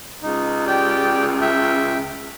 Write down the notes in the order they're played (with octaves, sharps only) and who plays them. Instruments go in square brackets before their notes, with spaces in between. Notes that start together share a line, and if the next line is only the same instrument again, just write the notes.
[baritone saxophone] C#2 [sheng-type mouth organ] D#4
[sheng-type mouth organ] G4 D5 G5
E5 G5